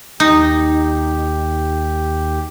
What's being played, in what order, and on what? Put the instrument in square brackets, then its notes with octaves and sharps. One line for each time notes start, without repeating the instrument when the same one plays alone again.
[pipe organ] D#2 G4 [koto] D#4